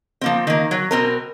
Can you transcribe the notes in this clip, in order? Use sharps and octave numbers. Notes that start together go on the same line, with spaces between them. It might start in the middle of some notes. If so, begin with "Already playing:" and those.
F3 A#3 C4
D#3 A#3
F#3
B2 C4 A#4